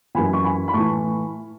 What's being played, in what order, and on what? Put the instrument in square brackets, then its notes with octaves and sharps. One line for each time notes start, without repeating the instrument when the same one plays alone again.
[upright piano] F#2 E3 G#5 B5
C#6
G#5 B5
B5
A2 E3 A5 C#6